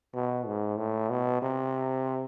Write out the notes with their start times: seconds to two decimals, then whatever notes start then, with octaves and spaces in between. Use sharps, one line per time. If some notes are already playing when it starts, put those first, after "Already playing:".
0.14 B2
0.46 G#2
0.78 A2
1.10 B2
1.42 C3